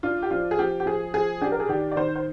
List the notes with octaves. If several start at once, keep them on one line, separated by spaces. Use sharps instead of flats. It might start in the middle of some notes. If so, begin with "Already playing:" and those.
D4 F4
G4
F3 F4
G#4
F3 G4
G4
F3 G#4
F3 G#4
D4 G4
A#4
G#4
D#3 G4
D5
D#3 C5
C5